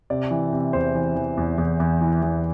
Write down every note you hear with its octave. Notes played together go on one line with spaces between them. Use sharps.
C3 D5
E3
C3
E2 C5
E3
E3
E2
E2
E2
E3
E2